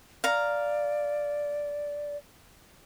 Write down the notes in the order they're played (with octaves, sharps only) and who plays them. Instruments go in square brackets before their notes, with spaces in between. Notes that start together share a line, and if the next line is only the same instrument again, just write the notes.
[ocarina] D5 [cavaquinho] F5 A#5